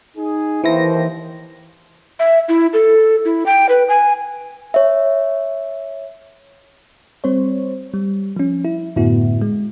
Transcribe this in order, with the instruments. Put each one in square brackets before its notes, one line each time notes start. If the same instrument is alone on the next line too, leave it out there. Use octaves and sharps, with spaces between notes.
[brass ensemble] D#4 G#4
[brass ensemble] D#2 C5 [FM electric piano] E3 E4 A#6
[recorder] E5
E4
A4
E4
G5
B4
G#5
[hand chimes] C#5 E5
[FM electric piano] G3 C4 C5 C#5
G3
F3 C#4
E4
F#2 A2 D3 B3 E4 F#4
G#3